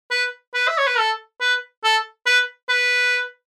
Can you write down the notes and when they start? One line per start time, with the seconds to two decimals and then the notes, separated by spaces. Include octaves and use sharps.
0.11 B4
0.54 B4
0.68 E5
0.78 C#5
0.87 B4
0.98 A4
1.41 B4
1.84 A4
2.26 B4
2.69 B4